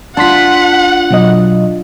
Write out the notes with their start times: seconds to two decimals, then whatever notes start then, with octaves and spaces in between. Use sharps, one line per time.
0.17 D4 F4 F#5 A5 C6 B6
1.11 B2 F#3 D#5